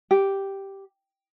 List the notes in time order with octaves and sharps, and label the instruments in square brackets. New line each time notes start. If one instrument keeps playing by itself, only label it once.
[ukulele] G4